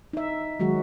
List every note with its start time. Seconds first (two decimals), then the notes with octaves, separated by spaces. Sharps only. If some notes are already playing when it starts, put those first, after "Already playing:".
0.13 D#4 E5
0.60 D#3 F#3 G#3 F#4